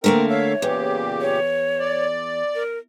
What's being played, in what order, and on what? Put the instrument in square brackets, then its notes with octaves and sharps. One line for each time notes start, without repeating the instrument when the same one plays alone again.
[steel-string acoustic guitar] D3 A3 A#3 [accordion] C4 A#4
[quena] C#5 [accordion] E5 F5
[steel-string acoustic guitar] E2 [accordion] A#2 C#3 G4
[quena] C#5
[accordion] D5
[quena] A#4